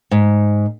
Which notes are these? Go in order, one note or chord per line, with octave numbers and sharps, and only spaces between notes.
G#2